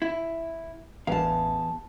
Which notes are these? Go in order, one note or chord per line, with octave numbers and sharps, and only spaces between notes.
E4
A1 E2 F5 A5